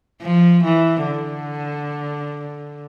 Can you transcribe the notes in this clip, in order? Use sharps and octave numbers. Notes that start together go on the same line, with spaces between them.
F3
E3
D3